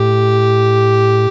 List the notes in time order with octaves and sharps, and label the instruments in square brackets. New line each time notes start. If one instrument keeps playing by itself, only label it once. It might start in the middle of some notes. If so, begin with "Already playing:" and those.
Already playing: [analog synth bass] A2 [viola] G4